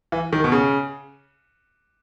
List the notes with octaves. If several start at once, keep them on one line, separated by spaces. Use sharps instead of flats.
E3
D#3
B2
C#3